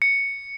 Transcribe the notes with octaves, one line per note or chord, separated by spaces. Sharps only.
C#7